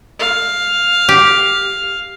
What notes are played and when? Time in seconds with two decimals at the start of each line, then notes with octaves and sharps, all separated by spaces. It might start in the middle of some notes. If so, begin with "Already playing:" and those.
0.19 F5
1.09 G4